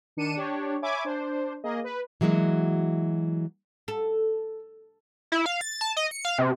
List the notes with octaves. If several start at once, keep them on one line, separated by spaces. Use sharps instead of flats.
D#3 D4 C#7 D#7 E7
D4 G4 C#5
C#5 E5 G#5 B5 D6 G#6
D4 C5
A#3 G#4 D#5
B4
E3 F#3 G#3 A#3 F#4
A4
E4
F5
A6
A5
D#5
C#7
F5
C3